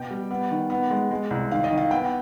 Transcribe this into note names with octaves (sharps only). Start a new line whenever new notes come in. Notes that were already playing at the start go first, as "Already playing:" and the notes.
Already playing: B2 G5
G3
B3
D#3
B3
G#3
G#3
C2
D#3 F5
D#5
D#3
F5
B3 G5